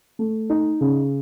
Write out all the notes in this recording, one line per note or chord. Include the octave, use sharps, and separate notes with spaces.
A3
D#4
C#3